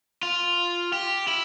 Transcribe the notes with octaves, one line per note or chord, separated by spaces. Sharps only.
F4
G4
E4